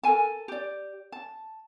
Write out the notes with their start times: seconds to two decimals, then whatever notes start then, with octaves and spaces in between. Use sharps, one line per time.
0.03 A4 A#4 G#5 A5
0.48 G4 D5
1.12 A5